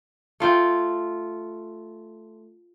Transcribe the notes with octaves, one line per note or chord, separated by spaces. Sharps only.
A3 F4 G5